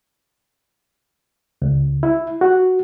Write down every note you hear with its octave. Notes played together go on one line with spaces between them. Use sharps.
C#2
E4
F#4